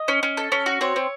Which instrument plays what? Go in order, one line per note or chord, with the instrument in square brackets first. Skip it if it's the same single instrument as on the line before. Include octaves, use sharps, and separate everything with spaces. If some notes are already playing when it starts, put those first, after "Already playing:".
Already playing: [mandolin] D#5
C#4
C#4
A4
C#4
F#4
C4 C#5
C4